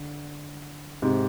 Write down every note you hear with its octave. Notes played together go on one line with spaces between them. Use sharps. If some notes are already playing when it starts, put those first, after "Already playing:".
Already playing: D3
G#2 C3